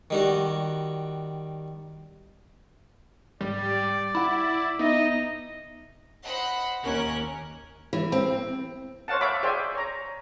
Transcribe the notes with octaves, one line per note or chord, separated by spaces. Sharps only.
D#3 G3 F#4
G#2 G3 D5
E4 F#5 B5
B3 D#4 D#5 E5
C5 D#5 F#5 B5
D#2 A#3 C#4 A#4 F#6
E3
C4
C5 C#5 F5 F#5 A5
C#5 E5 F5 B5 D6
G#4 C5 D5 E5 G5 G#5
C#5 A#5